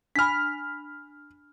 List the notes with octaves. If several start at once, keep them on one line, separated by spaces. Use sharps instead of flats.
D4 G#5 B5 F6 B6